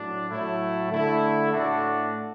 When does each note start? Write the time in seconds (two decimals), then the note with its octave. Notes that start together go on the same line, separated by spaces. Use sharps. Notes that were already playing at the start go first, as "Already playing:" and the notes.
Already playing: A2 F#3 D4
0.29 A2 F#3 A3 E4
0.90 D3 A3 E4
1.52 A2 A3 D4 F#4